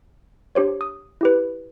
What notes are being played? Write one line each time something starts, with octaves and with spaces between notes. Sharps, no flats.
D4 G4 C5 C#5
D#6
E4 G4 B4